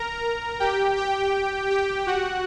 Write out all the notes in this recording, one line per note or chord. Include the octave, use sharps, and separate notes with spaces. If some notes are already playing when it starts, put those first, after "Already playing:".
Already playing: A#4 A#5
G4 G5
G4 G5
G4 G5
F#4 F#5